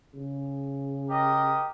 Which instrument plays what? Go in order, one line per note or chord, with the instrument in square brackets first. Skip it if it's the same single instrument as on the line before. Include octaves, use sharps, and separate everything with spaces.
[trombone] C#3
[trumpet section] G4 A#4 D#5